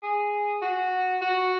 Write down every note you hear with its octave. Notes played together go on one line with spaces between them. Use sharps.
G#4
F#4
F#4